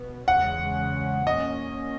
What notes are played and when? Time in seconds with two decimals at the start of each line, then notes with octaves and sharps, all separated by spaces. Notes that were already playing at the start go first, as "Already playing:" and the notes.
Already playing: B2 B3
0.28 E2 C#3 G#3 C#4 F#5
1.26 A#2 A#3 C#4 D#5